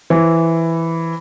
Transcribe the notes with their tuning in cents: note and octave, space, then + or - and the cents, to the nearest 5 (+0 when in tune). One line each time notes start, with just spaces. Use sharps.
E3 +0 C5 +0